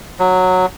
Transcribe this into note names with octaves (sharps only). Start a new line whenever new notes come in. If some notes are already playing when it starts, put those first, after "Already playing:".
F#3